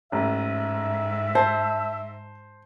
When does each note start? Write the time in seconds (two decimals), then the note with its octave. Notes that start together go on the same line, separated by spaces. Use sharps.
0.12 A1 G#2 E5
1.35 C5 A5